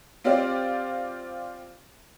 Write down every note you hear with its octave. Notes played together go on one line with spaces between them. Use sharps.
C4 F4 G4 C5 D5